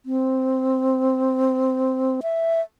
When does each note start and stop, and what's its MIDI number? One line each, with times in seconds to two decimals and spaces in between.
0.06 2.21 60
2.23 2.60 76